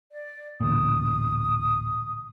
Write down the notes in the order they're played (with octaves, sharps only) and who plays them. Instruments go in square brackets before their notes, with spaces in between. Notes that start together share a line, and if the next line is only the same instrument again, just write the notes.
[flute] D5
[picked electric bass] A1 D2 A#2 [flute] D#6